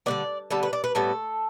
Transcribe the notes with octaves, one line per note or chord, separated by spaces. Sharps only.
D3 G3 B3 D5
D3 G3 B3 A4
B4
D5
B4
A2 G3 B3 A4